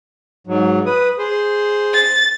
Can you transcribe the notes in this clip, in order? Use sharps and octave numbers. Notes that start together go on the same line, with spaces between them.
G#2 F#3
B4 D#6
G#4 C5
A6